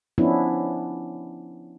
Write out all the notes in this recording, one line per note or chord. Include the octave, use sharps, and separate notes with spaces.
F3 B3 C#4 D4 E4